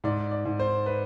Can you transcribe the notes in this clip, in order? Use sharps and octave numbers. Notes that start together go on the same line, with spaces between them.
G#2 D5
D5
G#2
C5
B4